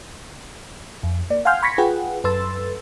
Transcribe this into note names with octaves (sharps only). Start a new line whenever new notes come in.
F2
A#3 D5
F5 F#5 G#5 C6 F6 G6
B5 C#6 G#6 A#6 B6 C#7
F4 G#4 B4 F#5 G5
F#2 A4 B4 C6 E6 A6